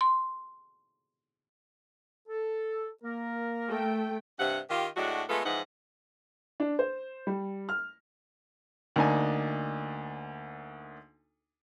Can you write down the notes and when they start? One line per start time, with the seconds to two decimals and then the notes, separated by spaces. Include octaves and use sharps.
0.01 C6
2.29 A4
3.03 A#3 A#4
3.69 A3 G5
4.40 G2 C3 F#5
4.70 D#3 F4 G4
4.97 A2 G#3 D4 F#4
5.29 G#3 A3 B3 F4 A4
5.45 G#2 E3 F3 D#4 F#5
6.60 D4
6.79 C5
7.27 G3
7.69 F6
8.96 D2 A#3 D4 D#4 G#5